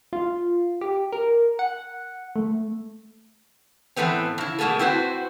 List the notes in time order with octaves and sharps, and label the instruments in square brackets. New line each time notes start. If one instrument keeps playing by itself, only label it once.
[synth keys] F4
G4
A#4
F#5
A3
[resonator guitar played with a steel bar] A2 E3 A3 B3 C4
C#3 E4
B2 F3 A3 A#3 G#4 A4
C4 E4 F#4 B4 C5